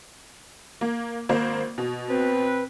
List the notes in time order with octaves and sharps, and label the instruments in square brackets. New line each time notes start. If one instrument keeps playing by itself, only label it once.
[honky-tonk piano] A#3
G#1 A#3 C5
B2
[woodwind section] C4 B4